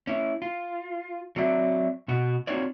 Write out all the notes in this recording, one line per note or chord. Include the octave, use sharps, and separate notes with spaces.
C#4 E4
F4
F#3 C4 F#4 D5 E5
B2 F#4
C4 D#4 F4 F#4 C#5 D5